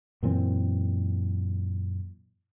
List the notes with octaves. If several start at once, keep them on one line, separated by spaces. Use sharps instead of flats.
F#2 A#2 E3 C4